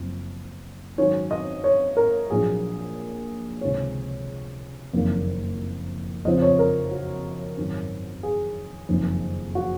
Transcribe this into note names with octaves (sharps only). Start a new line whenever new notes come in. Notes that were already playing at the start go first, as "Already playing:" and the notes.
Already playing: F#1 F#2 F3 C4
G#2 D#3 F#3 C#4 C#5
D#5
C#5
A#4
A#1 A#2 F#3 G#4
C#2 C3 D#3 G#3 C4 C#5
F#1 F2 D#3 A#3
F2 C#3 F3 C4 D#5
C#5
A#4
F#4
G#1 F#2 D#3 F#3 C#4
G#4
F#1 F2 D#3
F#4